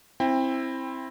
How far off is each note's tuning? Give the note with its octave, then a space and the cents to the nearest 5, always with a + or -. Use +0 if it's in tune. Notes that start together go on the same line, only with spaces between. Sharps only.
C4 +15 E4 +0 G5 +30